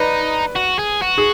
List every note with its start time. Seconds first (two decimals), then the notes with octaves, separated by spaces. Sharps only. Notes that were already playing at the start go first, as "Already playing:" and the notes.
Already playing: D#4 B4 D5
0.56 F#4
0.79 G#4
1.02 F#4
1.18 G#4